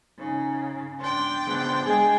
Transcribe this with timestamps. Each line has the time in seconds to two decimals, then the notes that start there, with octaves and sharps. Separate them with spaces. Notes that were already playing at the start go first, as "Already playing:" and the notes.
0.18 C#3 D#4
1.00 D4 G5 C6
1.47 C#3 B3
1.86 G#3 G#4 G#5